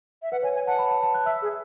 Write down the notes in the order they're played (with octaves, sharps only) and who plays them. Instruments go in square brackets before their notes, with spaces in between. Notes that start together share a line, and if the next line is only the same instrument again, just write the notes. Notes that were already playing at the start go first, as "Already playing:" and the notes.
[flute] E5
[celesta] B4 [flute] F#5
[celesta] C#5 [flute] G#5
[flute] G#5
[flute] F#5 [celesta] A5
[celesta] B5
A5
A5
F#6
[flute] E5 [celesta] E6
[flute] G#4